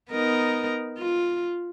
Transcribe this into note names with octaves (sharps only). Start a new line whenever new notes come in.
B3 D#4 A#4
F4